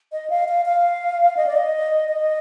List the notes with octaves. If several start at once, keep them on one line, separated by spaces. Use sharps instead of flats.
D#5
F5
F5
F5
D#5
D5
D#5
D#5